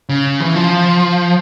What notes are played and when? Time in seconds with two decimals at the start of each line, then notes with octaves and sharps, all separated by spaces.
0.09 C#3
0.40 E3
0.55 F3